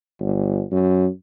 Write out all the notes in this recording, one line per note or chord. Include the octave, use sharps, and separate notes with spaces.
G1
F#2